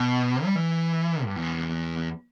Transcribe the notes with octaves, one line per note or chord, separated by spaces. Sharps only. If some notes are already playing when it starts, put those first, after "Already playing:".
Already playing: B2
G3
E3
G2
E2